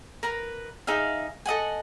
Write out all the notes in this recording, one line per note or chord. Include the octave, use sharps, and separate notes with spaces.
A#4 B4 A#5
D#4 G#4 E5 F5
A4 D#5 F#5 G#5